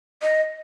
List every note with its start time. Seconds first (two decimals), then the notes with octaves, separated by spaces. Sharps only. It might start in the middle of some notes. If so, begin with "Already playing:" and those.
0.22 D#5